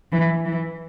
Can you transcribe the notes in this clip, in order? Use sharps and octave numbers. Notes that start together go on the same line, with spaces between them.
E3
E3